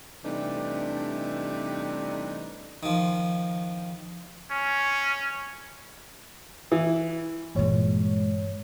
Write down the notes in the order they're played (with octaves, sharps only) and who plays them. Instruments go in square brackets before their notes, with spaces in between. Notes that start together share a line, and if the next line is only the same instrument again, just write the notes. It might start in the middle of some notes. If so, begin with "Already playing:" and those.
[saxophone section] C3 E3 G3 A3 D4 D#4
[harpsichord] D#3 F3
[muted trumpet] C#4
[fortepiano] E3
[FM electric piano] G2 E3 C#5 [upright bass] A#2 G#3